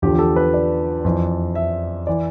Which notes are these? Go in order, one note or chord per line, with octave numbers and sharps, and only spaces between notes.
E2 D3 F3 G4
G4
A4
B4
D5
F2 E3
E5
E3 D5